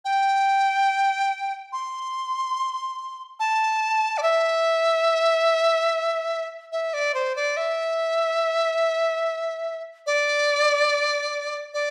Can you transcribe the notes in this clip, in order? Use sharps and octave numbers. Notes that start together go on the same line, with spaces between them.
G5
C6
A5
D5
E5
E5
D5
C5
D5
E5
D5
D5